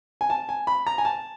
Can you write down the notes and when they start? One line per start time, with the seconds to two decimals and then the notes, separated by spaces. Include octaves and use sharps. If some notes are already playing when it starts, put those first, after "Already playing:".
0.21 G#5
0.30 A5
0.49 G#5
0.67 B5
0.87 A#5
0.98 G#5
1.05 A5